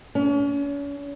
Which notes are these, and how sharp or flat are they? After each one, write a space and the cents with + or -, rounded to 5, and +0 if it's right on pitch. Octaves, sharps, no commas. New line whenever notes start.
C#4 +40